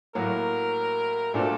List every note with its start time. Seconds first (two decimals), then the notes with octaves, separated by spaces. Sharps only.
0.15 A2 F#3 A#3 F#4 A#4
1.34 A#2 A3 D4 F#4 A4 C5